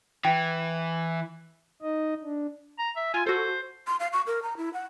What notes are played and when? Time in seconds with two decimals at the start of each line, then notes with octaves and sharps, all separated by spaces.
0.25 E3 G5
1.82 D#4 D#5
2.23 D4
2.79 A#5
2.97 E5
3.14 F4 G#5
3.26 F#4 A4 C5
3.87 C6
4.00 F5
4.13 C#6
4.27 A#4
4.43 A#5
4.57 E4
4.74 F#5